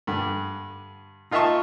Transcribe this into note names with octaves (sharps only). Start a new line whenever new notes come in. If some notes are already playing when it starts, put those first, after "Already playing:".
G2 D3
D#4 F4 D#5 E5 A5 C#6